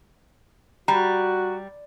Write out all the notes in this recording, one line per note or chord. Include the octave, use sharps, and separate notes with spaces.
G3 F#4 A#5